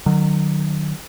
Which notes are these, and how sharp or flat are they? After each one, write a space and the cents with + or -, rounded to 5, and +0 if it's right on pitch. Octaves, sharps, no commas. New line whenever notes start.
D#3 -40 F#3 +0